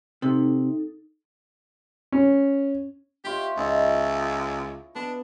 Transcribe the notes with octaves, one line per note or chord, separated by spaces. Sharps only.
C3 D#4 A4
C#4
E4 F4 G4 C#5
C#2 E4 D#5 C#6
B3 D4